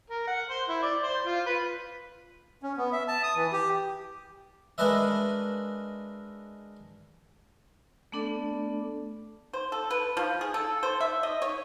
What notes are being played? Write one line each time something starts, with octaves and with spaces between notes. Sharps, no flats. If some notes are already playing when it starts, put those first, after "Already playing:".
A#4
F#5
C5
E4
D5
C5
F4
B4
C#4
B3
E5
A5
D#6
E3
G4
G#3 D4 A#4 B4 D#5 E5
A3 B3 D4 A4 D5
C5
A4
B4
F3
G#4
A4
C5
E5
D#5
C#5